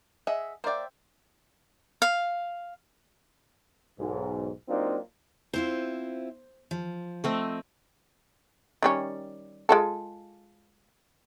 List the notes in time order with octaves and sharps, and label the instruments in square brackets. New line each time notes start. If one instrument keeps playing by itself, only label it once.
[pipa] G#4 [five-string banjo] D#5 E5 F#5
[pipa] A#3 D5 [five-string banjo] C5 E5 G5
[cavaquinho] F5
[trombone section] B1 G#2
F#3 A#3 C4 D4 D#4 F4
[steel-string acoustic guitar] C4 E4 F4 [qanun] C5
[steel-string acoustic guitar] F3
[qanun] A3 C4 D#5
[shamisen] D#3 G3 C#4
G#3 F4 A4